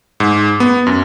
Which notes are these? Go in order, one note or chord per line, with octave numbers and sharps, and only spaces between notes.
G#2
B3
F#2